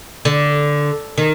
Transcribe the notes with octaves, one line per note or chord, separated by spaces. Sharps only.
D3
D#3